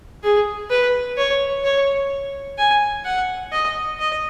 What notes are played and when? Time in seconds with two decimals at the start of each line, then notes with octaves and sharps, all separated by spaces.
0.24 G#4
0.70 B4
1.17 C#5
1.64 C#5
2.58 G#5
3.05 F#5
3.52 D#5
3.99 D#5